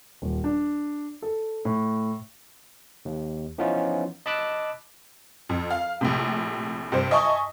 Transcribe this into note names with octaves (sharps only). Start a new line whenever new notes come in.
D#1
D4
A4
A2
D#2
E3 F3 B3 C#4 D#4 F4
D#5 A5 B5 D6 E6 F#6
F2
F5
A#1 A2 C3
G2 C3 C5
D#5 E5 G#5 A5 C#6 D#6